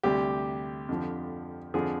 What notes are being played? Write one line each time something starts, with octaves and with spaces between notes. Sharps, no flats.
D2 C3 G3 G4
F2 D3 F3
F2 D3 F3 G#4